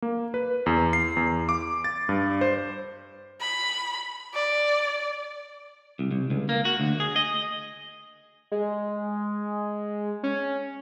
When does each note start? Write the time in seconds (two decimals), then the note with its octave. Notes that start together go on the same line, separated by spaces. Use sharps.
0.02 A#3
0.34 B4
0.66 E2
0.93 C7
1.17 E2
1.49 D6
1.84 A6
2.09 G2
2.41 C5
3.40 B5
4.34 D5
5.99 C2
6.11 C2
6.30 C#2
6.49 A#3
6.65 F#4
6.80 D2
7.00 G#4
7.16 D#5
8.52 G#3
10.23 C#4